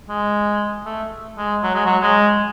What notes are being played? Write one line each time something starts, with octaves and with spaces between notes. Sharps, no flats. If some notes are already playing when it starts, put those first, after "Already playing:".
G#3
A3
G#3
F#3
G#3
F#3
G#3